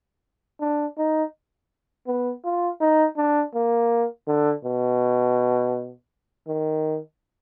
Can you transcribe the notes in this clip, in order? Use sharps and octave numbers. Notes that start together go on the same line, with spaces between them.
D4
D#4
B3
F4
D#4
D4
A#3
D3
B2
D#3